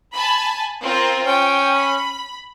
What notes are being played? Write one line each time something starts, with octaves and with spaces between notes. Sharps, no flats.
G#5 A5 B5
C4 F4 A#4
C#4 G5
B5